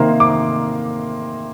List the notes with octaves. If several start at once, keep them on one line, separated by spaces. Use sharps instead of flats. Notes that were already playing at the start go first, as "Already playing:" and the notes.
Already playing: C3 D#3 A#3 C6
D6